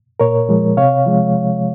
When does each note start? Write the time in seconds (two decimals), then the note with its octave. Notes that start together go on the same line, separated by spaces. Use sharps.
0.20 A#2 A#4 C#5
0.49 F3 G#3
0.77 C3 C#5 F5
1.06 F3 G#3